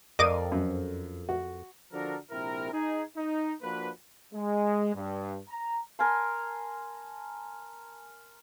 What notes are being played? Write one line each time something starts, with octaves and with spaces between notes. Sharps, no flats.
F2 A4 A#4 D5 D#5 F5 D6 D#7
F#2
F#4
D3 F3 D4 F#4 A4 A#4
A#1 C3 C4 E4 A#4
D#4 G#4
D#4
F3 A#3 D4 F#4 B4
G#3
G2
A#5
A#4 G#5 A5 C6